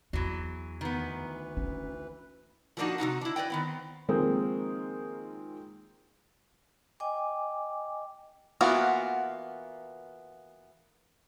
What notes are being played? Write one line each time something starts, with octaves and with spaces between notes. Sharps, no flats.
E2 E3 F#3
D2 D#3 E3 B3 B4
C#4
F3 F#3 A#3 D4 D#4 F#4
C3 D#3 D#4 F#4
D4 E4
B4 D5 D#5 G5
D#3 B3 C4
D#3 F3 G#3 A#3 C4
D#5 G5 G#5 D6
E3 A#3 B3 F4 F#4